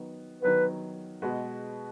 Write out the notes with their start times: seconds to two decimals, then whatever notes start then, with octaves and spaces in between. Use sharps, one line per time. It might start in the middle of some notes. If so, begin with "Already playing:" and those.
Already playing: D#3 F#3 B3
0.42 D#3 F#3 B3 B4
1.22 B2 G#3 B3 F#4 B4